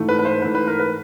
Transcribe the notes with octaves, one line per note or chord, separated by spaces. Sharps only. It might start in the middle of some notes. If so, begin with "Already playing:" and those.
Already playing: G#2 E3 A3
B4
B4
C5
G#2 E3 A3 B4
B4
A#4
B4